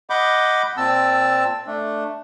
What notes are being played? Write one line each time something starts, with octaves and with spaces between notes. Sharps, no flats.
D#5 F#5 B5 D6 G6
A#2 C4 A5 E6
A3 D4